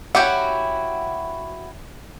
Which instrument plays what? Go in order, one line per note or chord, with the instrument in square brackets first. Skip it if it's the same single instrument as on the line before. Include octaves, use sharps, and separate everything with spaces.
[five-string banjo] C#4 G4 F#5 [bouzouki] E4 F#4